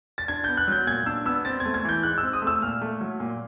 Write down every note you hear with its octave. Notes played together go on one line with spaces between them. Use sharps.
A6
D4 G#6
G6
B3
F#6
F#3 G6
A#2 G#6
D4 E6
B3 E6
C4 A6
G#6
A3
G#6
E3 G6
G#2 F#6
E6
C4
D#6
A3
E6
A#2 F6
A3
F#3
A#2